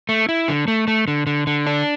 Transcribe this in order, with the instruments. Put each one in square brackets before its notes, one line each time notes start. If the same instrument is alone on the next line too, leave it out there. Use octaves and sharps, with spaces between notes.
[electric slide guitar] A3
E4
D3
A3
A3
D3
D3
D3
D4